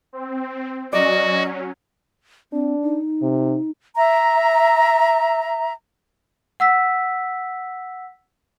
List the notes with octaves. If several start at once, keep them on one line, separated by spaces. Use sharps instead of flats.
C4
F#3 C#4 F#4 D5 D#5
C4 D4
D#4
C3
E5 A#5
F#5 E6 B6